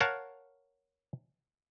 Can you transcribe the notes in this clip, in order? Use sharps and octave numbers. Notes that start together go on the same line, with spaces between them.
A#4 C#5 F5 F#5 A5